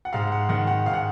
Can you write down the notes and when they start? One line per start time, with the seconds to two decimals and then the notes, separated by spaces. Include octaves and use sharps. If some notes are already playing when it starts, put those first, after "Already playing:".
0.05 F#5
0.13 G#2 F5
0.32 F#5
0.49 D#3 F#5
0.67 F#5
0.86 G#2 F5
0.94 F#5